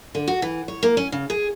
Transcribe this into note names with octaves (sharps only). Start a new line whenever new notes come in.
D3
F#4
E3
C#5
A#3
C#4
C#3
G#4